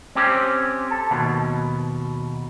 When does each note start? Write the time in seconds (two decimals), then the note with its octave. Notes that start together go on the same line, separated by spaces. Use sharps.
0.15 C4 C#4 G4
0.91 A4
1.11 D#2 B2